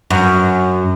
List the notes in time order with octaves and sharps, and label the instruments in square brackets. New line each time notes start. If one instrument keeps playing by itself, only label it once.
[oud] F#2